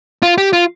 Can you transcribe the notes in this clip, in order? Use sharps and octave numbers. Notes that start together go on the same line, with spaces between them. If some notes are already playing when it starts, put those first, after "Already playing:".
F4
G4
F4